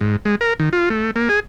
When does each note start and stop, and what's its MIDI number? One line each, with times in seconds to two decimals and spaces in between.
0.01 0.16 44
0.25 0.35 56
0.41 0.54 70
0.60 0.69 51
0.73 0.89 65
0.90 1.11 57
1.16 1.29 58
1.29 1.40 68